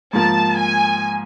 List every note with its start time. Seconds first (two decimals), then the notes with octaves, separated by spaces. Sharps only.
0.13 G#2 F3 A#3 A5
0.56 G#5